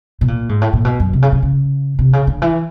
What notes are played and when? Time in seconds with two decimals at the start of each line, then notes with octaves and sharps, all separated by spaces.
0.21 B2
0.28 A#2
0.49 G#2
0.61 A2
0.73 A#2
0.85 B2
1.00 F#2
1.13 C3
1.22 C#3
1.32 C#3
1.42 C#3
1.99 C3
2.13 C#3
2.27 D3
2.42 E3